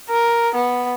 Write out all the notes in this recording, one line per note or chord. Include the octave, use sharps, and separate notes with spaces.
A#4
B3